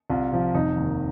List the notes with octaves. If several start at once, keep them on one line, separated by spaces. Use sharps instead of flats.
C2 F4
C3 F3
F1 D#4
D#2 D#3